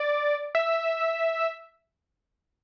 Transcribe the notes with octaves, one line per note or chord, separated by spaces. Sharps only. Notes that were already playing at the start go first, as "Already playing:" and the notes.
Already playing: D5
E5